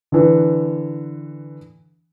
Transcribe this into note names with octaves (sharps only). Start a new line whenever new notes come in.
D3 E3